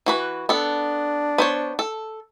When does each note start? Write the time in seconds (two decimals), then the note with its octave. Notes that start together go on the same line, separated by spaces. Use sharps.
0.06 E3 F#4 B4
0.49 B3 D4 A4
1.38 B3 C5 C#5
1.79 A4